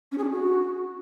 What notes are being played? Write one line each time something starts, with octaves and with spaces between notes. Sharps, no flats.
C#4
G#4
D4
F#4